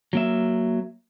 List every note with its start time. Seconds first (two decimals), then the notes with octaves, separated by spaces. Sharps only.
0.13 F#3 A#3 E5